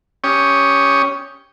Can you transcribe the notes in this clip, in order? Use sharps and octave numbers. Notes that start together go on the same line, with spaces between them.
C#4 G4 C#5 D#6